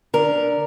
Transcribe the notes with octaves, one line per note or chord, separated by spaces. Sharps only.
D3 A#4